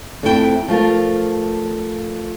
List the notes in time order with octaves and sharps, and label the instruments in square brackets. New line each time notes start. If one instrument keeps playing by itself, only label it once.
[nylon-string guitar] F2 A3 C4 E4 G5
F3 A3 F4 A#4